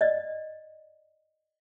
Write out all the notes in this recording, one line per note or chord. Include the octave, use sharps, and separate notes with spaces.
D5 D#5